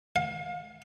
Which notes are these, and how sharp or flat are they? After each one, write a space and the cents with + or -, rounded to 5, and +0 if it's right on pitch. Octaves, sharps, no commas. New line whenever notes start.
F5 +30